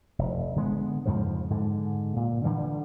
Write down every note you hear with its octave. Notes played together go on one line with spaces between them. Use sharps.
F1
D3 G#3 B3
F2 G#2 C#3 F3
G#2 D3
A#2
D3 E3 G3